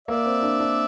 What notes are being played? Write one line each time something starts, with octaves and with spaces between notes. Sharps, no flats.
A#3 D5 E5
C4
D4
D4